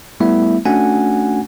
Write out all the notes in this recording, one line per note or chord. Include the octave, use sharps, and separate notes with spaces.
G3 A3 B3 E4 E5
A3 C#4 D4 F#4 F#5 G#5